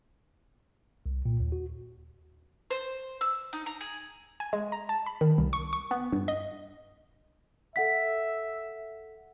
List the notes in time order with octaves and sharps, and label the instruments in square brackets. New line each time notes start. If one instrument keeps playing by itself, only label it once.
[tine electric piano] C2
A#2
D#2
F#4
[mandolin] C5
E6
D#4
A#5
G#4
[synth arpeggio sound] G#5
G#3
A#5
A5
B5
D#3
C2
C#6
C#6
B3
G2
D#5
[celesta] A4 F#5 B6 [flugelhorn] E5